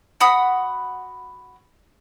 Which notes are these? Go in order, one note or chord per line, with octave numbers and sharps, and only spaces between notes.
F#4 F#5 B5 D#6